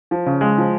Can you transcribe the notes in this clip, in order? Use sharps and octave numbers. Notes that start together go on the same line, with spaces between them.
F3
C#3
G#3
F3